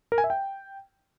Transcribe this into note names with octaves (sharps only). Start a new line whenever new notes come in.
A#4
G#5
E5
G5